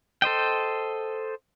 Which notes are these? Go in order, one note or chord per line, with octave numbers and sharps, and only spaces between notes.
A4 C5 D#5 G5